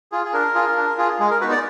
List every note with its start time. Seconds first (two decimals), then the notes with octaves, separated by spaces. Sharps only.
0.12 F4 G#4
0.25 G#4
0.33 D4 A#4
0.55 F4 G#4
0.77 D4
0.98 F4 G#4
1.20 G#3 G#4
1.31 A#4
1.41 B3 D#4 F#4 B4
1.52 D5